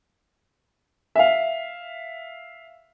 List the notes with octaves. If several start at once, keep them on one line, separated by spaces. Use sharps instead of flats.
E5 F5